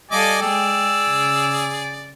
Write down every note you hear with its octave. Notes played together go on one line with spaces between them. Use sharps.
G3 A4 D5 D#5 F5 G#5 D6
G#3 G#4 D5 G5 E6
C#3